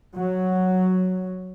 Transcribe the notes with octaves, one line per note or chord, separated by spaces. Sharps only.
F#3